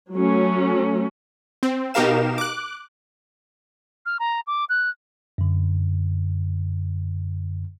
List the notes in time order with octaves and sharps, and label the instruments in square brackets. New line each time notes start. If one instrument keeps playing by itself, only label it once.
[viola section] F#3 A3 C#4
[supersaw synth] C4
B2 D#4 G4 A#4 F5 E7
D6 F#6
[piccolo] F6
A#5
D6
F#6
[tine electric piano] F#2 D3